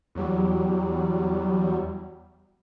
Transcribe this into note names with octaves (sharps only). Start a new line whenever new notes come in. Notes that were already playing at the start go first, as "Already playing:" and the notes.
E2 F#3 G3